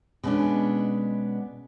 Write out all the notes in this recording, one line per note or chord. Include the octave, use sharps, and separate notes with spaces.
B2 G#3 A3 B3 C#4 D4